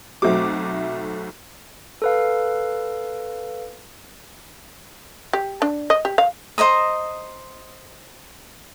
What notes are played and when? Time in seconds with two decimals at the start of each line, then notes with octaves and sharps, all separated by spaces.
0.22 B1 F#3 A3 C4 F#4 D6
2.02 A4 B4 F5
5.33 G4
5.62 D4
5.90 D#5
6.05 G4
6.18 F5
6.58 C5 D#5 A#5 D#6